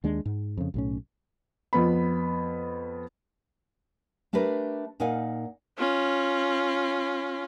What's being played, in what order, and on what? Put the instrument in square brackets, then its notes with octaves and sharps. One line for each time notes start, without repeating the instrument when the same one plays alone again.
[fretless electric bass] D#2 G#3 D4
G#2
F2 C#3
B1 A2 C#4
[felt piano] F2 B3 B5
[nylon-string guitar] A3 D4 G4 A#4 B4
A#2 D#4 A#4 F5 F#5 G#5
[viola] C#4 F4